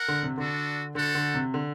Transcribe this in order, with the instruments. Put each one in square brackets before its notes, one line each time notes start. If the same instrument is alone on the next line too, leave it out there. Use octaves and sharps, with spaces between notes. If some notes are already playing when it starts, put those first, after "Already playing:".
Already playing: [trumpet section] A#4 F#5
[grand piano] D3
C3
[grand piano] D3 [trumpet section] D4 F#4 A4
[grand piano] D3 [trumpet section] F#4 A4 C5 F#5
[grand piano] D3
C3
D3